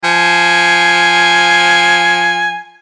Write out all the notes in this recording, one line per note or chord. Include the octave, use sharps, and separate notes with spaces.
F3 G#5